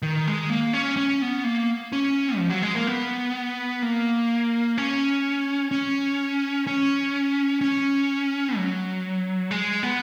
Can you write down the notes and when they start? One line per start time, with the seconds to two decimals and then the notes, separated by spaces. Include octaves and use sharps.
0.02 D#3
0.27 G#3
0.50 A#3
0.73 C#4
0.97 C#4
1.22 B3
1.44 A#3
1.92 C#4
2.37 F3
2.50 F#3
2.62 G#3
2.75 A#3
2.87 B3
3.82 A#3
4.78 C#4
5.71 C#4
6.67 C#4
7.61 C#4
8.57 F#3
9.51 G#3
9.83 B3